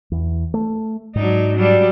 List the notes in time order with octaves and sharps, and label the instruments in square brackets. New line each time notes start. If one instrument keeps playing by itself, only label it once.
[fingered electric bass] E2
A3
[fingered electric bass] G#2 [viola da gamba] F#3 D4 D#4
[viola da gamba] F#3 G3 D4